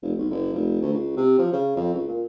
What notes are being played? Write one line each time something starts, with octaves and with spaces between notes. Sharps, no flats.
F1
B1
F#1
F1
D2
C#2
C3
F3
C#3
F2
C#2
A#2